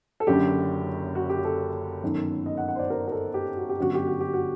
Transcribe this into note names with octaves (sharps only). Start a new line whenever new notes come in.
A4
F#1 F#2 D3 G4
F#4
G4
A4
G1 F#2 D#3
D#5
F#5
F#5
C5
D5
A#4
A#4
A4
G4
F#4
G4
G1 F#2 D3 F#4
G4
F#4
G4
F#4